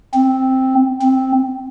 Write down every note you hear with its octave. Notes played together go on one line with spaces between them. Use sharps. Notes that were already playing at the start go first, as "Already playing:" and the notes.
C4
C4